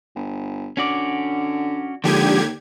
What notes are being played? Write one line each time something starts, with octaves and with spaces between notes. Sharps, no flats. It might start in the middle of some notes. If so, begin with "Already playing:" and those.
G1
D3 C#4 F#4 D5
D#2 D3 F3 G#3 G4 G#6